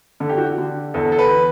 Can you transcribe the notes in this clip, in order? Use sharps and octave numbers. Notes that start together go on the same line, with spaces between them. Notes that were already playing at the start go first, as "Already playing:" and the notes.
D3 A4
G4
F#4
G4
D3
E2 A4
A4
B4